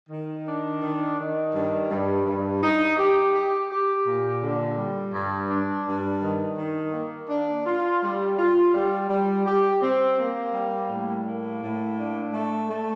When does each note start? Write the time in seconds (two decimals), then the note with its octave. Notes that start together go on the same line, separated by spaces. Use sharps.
0.10 D#3
0.46 D4
0.81 D#3
1.18 D#3
1.53 G2
1.90 G2
2.25 G2
2.62 D#4
2.97 G4
3.34 G4
3.70 G4
4.06 A#2
4.41 D3
4.77 G3
5.13 G2
5.49 D4
5.85 G2
6.21 D#3
6.58 D#3
6.93 A#3
7.29 D4
7.65 F4
8.01 G3
8.37 F4
8.74 G3
9.09 G3
9.45 G4
9.81 C4
10.17 A#3
10.53 G3
10.89 A2
11.25 A#3
11.61 A2
11.97 D4
12.33 A3
12.69 A3